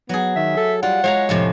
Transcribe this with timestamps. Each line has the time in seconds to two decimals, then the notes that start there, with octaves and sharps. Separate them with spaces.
0.09 F#3 B3 G#4
0.36 D#3 E5
0.57 A4
0.83 G3 F4 F#5
1.04 G#3 C#5 F5 A#5
1.29 F2 A2 C3